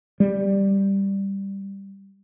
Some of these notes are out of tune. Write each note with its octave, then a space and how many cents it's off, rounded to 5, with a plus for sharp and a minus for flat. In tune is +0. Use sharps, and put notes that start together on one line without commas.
G3 +5